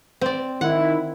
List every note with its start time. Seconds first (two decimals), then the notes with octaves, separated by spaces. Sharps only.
0.21 C4 D5
0.61 D#3 E4 F#5